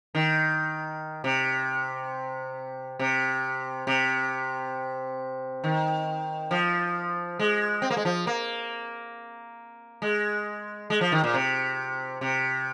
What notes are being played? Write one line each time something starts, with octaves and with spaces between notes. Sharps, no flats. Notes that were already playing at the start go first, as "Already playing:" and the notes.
D#3
C3
C3
C3
D#3
F3
G#3
C4
A#3
G#3
F3
A#3
G#3
G#3
F3
D#3
A#2
C3
C3